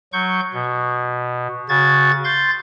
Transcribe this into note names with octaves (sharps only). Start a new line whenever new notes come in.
F#3 C#6 G6
B2
C#3 F#4 G#6 A6
C6 G6 A6